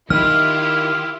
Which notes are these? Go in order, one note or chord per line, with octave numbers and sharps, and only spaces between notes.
D#3 E4 F4 G4 F6